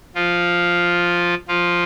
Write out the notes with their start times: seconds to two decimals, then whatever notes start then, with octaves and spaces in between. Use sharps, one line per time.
0.15 F3 F4
1.48 F3 F4